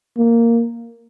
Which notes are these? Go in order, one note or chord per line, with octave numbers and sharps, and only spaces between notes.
A#3